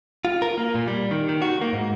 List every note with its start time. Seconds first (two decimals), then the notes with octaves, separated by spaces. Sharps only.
0.25 F4
0.42 A#4
0.58 A#3
0.75 A#2
0.87 G3
1.11 D#3
1.29 D#3
1.42 F#4
1.61 A#3
1.73 G#2